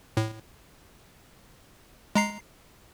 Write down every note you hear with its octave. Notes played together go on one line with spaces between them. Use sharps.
A2
G#3 A#5 C7